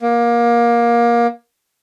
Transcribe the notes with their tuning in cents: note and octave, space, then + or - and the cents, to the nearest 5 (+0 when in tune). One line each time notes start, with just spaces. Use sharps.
A#3 +20